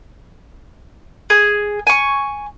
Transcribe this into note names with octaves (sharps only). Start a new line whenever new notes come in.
G#4
G#5 C#6